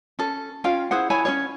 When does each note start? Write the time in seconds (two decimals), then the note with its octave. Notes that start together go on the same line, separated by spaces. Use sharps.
0.19 C#4 A4
0.64 C#4 F4 F5 G5
0.91 E4 G#4 C5 F#5
1.10 E4 C#5 G#5 B5
1.25 C#4 F4 C#5